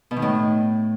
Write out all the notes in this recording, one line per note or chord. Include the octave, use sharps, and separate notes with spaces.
B2
D#3
A2